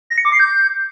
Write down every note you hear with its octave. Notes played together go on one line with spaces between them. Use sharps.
A#6
C#7
D6
C7
G6